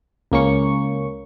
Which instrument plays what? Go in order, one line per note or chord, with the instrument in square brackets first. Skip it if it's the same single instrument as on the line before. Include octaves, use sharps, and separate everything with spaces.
[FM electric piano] C#2 A#3 C#4 C#6